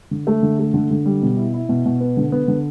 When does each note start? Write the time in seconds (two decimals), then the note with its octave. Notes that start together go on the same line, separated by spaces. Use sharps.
0.11 D3
0.27 A3
0.43 D3
0.59 A3
0.74 D3
0.91 D3
1.06 G3
1.22 B2
1.37 E4
1.54 E4
1.69 B2
1.86 B2
2.00 B3
2.17 D3
2.32 B3
2.48 D3